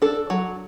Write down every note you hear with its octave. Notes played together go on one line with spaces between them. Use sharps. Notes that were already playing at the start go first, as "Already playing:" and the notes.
D4 A4
F#3